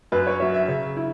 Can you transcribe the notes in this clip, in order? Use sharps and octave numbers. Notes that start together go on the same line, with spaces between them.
F#2 B4
C#5
F#3 C#4 E5
E5
C#3
E4